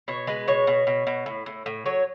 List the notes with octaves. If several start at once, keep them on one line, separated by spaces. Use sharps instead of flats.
B2 C#5
G#3 B4
B2 C#5
B2
B2
B2
A2
A2
A2
F#3 C#5